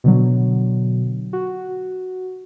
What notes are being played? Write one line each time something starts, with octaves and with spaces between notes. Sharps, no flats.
B2 D3 F#3
F#4